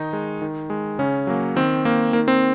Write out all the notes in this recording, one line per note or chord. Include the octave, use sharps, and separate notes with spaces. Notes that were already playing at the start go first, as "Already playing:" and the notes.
Already playing: D#3 D#4
G#3
D#3
G#3
C#3 C#4
F#3 A#3
D#3 C4
A#3
D#3 A#3
C4